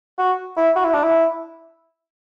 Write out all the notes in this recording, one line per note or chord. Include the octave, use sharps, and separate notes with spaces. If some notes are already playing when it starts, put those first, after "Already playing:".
F#4
E4
F#4
E4
D4
E4